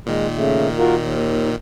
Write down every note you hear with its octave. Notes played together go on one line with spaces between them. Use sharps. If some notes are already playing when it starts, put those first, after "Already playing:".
A#2 D#3 G#3
C#3 A3
F4 F#4 A#4
D#2